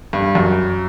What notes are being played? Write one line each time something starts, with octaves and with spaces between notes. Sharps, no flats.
G2
F#2